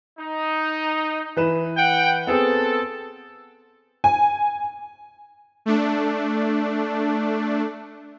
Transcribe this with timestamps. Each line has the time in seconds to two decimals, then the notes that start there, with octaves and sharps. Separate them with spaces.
0.19 D#4
1.37 E3 B4 E7
1.76 F#5 G5
2.27 B3 C4 G#4 A4
4.04 G#5
5.66 A3 D4